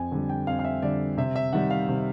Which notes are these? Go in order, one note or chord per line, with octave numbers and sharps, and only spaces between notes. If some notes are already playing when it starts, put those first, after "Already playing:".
Already playing: F2 G#5
D3 G3
G5
F2 F5
F5
E5
D3 G3 D5
C3 E5
E5
D#3 G3 F#5
F5
C3